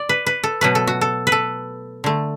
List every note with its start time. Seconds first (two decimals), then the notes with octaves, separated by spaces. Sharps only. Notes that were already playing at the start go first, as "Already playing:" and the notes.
Already playing: D5
0.09 B4
0.26 B4
0.44 A4
0.61 B2 F#3 A3 B4
0.75 A4
0.87 F#4
1.01 A4
1.27 B4
1.32 A4
2.04 D3 A3